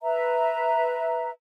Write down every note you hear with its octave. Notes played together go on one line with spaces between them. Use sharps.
B4 E5 A#5